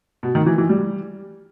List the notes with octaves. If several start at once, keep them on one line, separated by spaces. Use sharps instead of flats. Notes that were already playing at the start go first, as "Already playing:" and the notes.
B2
D#3
E3
E3
G3